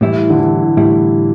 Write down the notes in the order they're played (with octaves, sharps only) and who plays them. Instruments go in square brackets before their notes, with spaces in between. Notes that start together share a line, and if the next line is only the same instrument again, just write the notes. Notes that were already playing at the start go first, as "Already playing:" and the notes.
[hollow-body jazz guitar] A2 G3 E4 [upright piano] E3
[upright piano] D3
E3
[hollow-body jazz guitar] A2 G3 E4